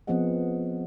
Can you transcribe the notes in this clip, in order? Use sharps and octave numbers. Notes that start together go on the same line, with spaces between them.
F3 B3 C4 G#4 D#5 F#5